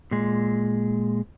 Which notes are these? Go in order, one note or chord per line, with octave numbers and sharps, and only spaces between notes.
A#2 G#3